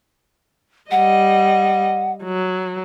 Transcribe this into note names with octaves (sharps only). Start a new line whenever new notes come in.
G3 D#5 F#5
F#3